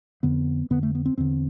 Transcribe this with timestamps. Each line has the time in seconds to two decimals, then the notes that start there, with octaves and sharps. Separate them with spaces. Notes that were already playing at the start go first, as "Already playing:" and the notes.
0.23 F2 D3 B3
0.70 F2 D3 B3
0.83 A3
0.95 B3
1.06 C4
1.18 E2 D3 C4